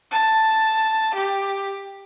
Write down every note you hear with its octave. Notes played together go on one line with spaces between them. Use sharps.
A5
G4